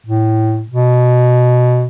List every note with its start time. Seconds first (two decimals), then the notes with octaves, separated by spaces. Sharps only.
0.06 A2
0.71 B2